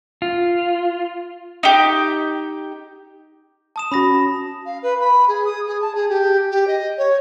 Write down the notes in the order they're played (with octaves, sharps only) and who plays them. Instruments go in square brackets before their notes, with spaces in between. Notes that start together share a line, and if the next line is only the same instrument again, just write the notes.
[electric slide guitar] F4
[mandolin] D#4 G4
[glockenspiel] A5 D#6 E7
[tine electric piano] C#4 F#4 [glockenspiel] B5 D#6 A#6
[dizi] F5
B4
B5
G#4
D#6
G#4
A5
G#4
G4
G4
D#5
C#5